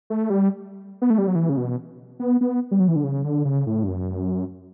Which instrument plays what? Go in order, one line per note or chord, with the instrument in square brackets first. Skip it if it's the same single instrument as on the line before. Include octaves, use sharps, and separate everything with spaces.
[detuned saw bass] A3
G3
B3
A3
G3
F#3
E3
C#3
B2
B3
B3
G3
F#3
E3
D3
C#3
D3
C#3
A2
G2
F#2